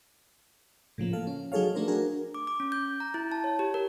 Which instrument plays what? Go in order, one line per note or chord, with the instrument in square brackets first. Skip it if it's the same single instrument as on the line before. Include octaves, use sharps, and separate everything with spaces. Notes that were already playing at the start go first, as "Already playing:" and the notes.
[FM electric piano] A2 C#3 F3 A#3
A4 F5
C#4
F#3 D#4 G#4 A4 C#5 F5
F3 A3 D4 A#4 C5
D4 F#4 G#4 A#4
[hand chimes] D6
D6
C#4
G6
A#5
E4
A5
C#5
G4
A#4